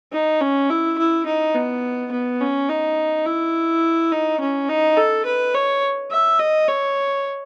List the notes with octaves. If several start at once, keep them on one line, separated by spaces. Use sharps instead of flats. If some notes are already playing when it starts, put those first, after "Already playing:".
D#4
C#4
E4
E4
D#4
B3
B3
C#4
D#4
E4
D#4
C#4
D#4
A4
B4
C#5
E5
D#5
C#5